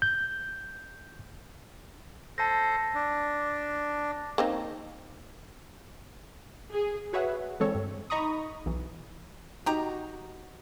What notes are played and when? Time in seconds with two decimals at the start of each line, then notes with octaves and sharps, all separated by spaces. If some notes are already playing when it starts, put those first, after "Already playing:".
0.02 G6
2.38 A4 C5 A5 A#6
2.95 D4
4.38 A#3 C4 D#4
6.71 G#4
7.13 F#4 G#4 B4 C#5 E5 F#5
7.60 D3 E3 G#3 C4 A4 C#5
7.75 G2
8.10 D#4 D#5 A#5 B5 C#6 D#6
8.66 B1 E3
9.66 D#4 F#4 G4 A#5